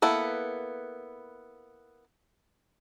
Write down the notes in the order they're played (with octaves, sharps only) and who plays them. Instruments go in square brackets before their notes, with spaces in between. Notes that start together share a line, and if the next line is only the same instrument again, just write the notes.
[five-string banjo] A#3 B3 E4 A4 B4